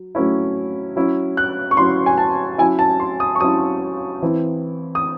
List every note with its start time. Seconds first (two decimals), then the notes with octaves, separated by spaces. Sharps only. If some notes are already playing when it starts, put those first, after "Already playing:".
Already playing: F#3
0.15 F#3 A3 C#4 E4
0.96 F#3 C#4 E4
1.37 F#6
1.71 C#6
1.77 F#3 C#4 E4 C6
2.06 G#5
2.18 A5
2.58 F#3 C#4 E4 G#5
2.79 A5
3.00 C6
3.20 D#6
3.35 C#6
3.40 F#3 C#4 E4 D#6
4.22 E3 C4 E4
4.95 D#6